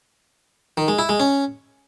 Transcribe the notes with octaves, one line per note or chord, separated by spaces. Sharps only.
D#3
G#3
E4
G#3
C#4